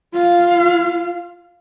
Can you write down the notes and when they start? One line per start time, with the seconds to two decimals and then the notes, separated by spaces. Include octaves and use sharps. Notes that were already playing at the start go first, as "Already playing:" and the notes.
0.14 F4 F5